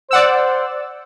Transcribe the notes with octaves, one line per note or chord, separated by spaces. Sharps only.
C5 D5 F#5 E6